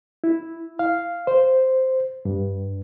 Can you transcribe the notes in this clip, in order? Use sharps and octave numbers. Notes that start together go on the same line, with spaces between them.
E4
F5
C5
G2